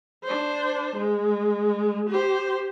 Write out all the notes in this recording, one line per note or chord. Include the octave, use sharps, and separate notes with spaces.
D4 C5
G#3
G4 C5